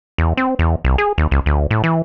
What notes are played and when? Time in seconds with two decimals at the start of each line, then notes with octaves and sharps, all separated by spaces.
0.18 E2
0.37 C4
0.59 E2
0.85 C2
0.98 G#4
1.18 D#2
1.31 C#2
1.46 D2
1.71 A2
1.84 E3